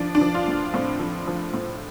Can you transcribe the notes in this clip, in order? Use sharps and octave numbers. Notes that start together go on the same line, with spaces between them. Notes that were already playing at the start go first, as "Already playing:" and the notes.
Already playing: F3 D4
D4
F3
F4
A2
A2 C4
F3
F3
A2